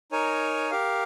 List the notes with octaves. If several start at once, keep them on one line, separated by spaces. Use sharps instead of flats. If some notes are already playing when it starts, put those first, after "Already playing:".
D#4 A#4 C#5 G#5
G4 A#4 F5